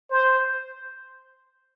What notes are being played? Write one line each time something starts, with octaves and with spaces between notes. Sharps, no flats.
C5